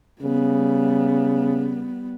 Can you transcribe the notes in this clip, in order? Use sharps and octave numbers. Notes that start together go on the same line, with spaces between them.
C#3 G3 B3